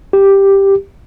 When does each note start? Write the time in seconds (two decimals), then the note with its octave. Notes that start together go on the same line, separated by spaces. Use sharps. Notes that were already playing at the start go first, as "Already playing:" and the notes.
0.13 G4